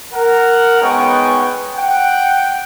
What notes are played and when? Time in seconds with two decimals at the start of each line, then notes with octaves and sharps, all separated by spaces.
0.14 A#4 F#5
0.81 G#3 B3 C#4 D#4 G5 C#6
1.77 F#5 G5